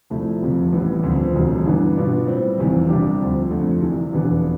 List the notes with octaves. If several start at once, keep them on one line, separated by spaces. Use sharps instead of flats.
C2 C3 F3 A3 E4
F1 F2 C3
A1 A2 G3 B3
D2 C3 F3 C4
E1 D2 C3 G3
G2 E3 B3 D4
B2 B3 D4 F4
A2 G3 C4
F1 E2 C3 E3
C2 C3 G3 D4 G4
D2 C3 F3
F2 D3 A3
C2 C3 E3
F1 E2 B2 B3 D4